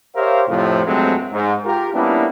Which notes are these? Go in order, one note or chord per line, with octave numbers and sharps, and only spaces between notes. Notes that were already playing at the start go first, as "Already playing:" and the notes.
G4 A#4 C5 C#5 E5 F5
F2 A2 C3 F3
G2 F#3 G#3 A3 C4
G#2
F4 G4 A#4
G3 A#3 B3 C#4 D4 E4